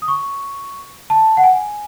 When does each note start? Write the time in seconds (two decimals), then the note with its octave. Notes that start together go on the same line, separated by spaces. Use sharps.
0.02 D#6
0.08 C#6
1.10 A5
1.37 F#5
1.44 G#5